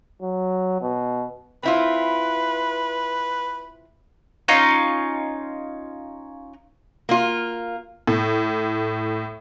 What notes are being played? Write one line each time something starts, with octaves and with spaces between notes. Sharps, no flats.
F#3
B2
C4 E4 F4 B4
C#4 D#4 F4
A#3 F4
A2